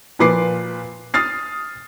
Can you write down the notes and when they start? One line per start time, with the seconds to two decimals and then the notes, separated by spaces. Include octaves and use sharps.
0.19 A#2 F3 B4 D6 C7
1.14 D#6 F6 A6 C7